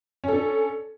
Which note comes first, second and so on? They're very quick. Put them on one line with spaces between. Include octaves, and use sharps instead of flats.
C#4 A4 D4